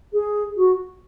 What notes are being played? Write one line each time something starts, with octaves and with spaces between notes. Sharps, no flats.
G#4
F#4